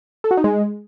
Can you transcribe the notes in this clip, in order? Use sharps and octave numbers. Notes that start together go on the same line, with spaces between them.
A4
F#4
D#4
G#3